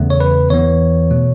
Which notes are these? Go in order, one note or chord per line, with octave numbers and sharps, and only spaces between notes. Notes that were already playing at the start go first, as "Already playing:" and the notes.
Already playing: E2 C#3 A3
C#5
B4
E2 E3 B3 C#5
B2 A3